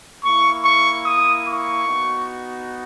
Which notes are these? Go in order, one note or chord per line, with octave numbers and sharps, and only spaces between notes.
A#3 E4 C#6
C#6
D#6
C#6
B3 D#4 F#4